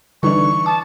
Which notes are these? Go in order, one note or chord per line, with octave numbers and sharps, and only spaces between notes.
D3 E3 G3 D4 D#4 C#6
A5 D6 D#6